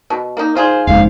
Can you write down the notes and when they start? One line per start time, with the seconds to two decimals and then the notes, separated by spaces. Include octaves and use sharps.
0.10 B2
0.37 A#3 D#4
0.55 D#3 F4 G#4 C5
0.87 F#1 F2 G#2 F5